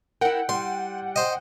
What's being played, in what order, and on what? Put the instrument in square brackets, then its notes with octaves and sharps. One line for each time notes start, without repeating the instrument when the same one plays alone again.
[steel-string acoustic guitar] E4 A#4 [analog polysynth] F#5 G5
[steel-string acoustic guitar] G3 [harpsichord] C6
[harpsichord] C5 D#5